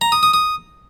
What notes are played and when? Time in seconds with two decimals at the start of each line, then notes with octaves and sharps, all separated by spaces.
0.01 A#5
0.12 D#6
0.23 D#6
0.34 D#6